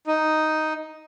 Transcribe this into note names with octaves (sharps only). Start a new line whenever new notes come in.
D#4